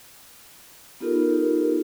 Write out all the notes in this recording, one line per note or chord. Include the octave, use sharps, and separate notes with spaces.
B3 D#4 F4 G4 A4 A#4